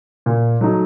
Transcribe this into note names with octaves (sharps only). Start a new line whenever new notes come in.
A#2
F#3 A3 D#4